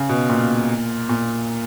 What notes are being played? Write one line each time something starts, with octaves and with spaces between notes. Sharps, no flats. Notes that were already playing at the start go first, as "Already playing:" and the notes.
Already playing: C#3
B2
A#2
A#2